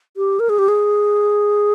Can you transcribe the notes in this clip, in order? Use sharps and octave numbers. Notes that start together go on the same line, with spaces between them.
G4
A#4
G#4
G4
G#4